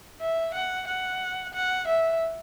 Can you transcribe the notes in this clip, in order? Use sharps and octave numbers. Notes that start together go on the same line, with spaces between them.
E5
F#5
F#5
F#5
E5